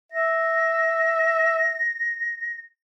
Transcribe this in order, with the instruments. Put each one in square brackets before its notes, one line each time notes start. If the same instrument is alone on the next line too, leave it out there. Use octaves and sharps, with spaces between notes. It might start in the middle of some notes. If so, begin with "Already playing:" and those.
[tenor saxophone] E5 [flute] A#6